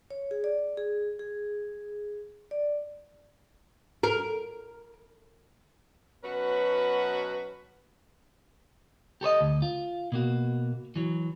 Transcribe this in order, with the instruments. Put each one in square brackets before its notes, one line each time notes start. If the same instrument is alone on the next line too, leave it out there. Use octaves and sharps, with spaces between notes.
[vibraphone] C#5
G#4
D5
G#4
G#4
D5
[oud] A#4
[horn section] B2 F#3 C#4 F#4 B4
[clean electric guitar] G4 A4 C5 D#5
D2
F4
B2 A#3 F#4
E3 F#3